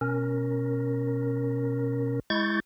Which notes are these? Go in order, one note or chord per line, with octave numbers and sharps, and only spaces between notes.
B2 C#4 A#4
G#3 E4 C#6 G6 A6